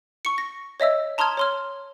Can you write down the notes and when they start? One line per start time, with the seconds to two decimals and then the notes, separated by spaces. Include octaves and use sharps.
0.25 C#6 C#7
0.38 A#6
0.80 C#5 D#5 E5 E6
1.18 A5 A#5 C6 D#6 F6 G#6
1.37 C#5 C6 F6